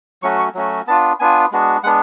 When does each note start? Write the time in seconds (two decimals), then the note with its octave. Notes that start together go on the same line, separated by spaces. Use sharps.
0.23 F#3 A3 C#4 F#4 C#6
0.39 C#6
0.55 F#3 A3 C#4 F#4
0.87 B3 D4 F4 A5
1.20 B3 D4 F4 G#5
1.51 G#3 B3 D4 F#4
1.83 G#3 B3 D4 F#5